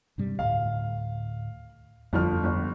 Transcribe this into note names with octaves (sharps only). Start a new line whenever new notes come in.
G2 C3 G3
D2 A2 F5
G1 F2 F3 F6
G1